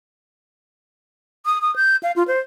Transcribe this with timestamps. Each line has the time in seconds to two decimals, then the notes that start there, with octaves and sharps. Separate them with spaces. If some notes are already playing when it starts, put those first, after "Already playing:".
1.46 D#6
1.62 D#6
1.76 G6
2.03 F5
2.16 F4
2.28 C5